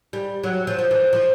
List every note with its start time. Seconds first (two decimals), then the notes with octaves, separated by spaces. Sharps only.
0.13 G3
0.44 F#3
0.67 F3
0.79 F3
0.91 E3
1.13 F3